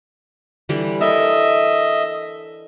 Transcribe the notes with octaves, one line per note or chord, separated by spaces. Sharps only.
D3 E3 G3
A4 A#4 D#5 E5